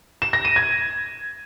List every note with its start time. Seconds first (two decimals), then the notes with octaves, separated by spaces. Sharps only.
0.22 E7
0.33 A#6
0.45 D#7
0.56 G#6